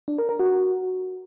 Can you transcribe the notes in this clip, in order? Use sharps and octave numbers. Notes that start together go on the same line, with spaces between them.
D4
A#4
A#4
F#4